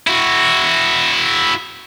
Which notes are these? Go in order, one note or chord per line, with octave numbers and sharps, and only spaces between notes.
E4 F#4